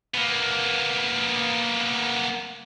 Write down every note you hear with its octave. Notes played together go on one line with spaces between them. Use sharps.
A#3 B3